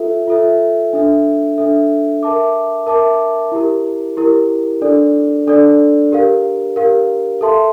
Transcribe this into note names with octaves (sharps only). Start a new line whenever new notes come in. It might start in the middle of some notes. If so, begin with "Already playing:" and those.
Already playing: F4 A4 E5
F4 A4 E5
D4 A4 E5
D4 A4 E5
A#4 E5 A5 D6
A#4 E5 A5 D6
E4 G4 A#4
E4 G4 A#4
D4 A4 D5
D4 A4 D5
G4 A#4 F5
G4 A#4 F5
A4 E5 A5 C6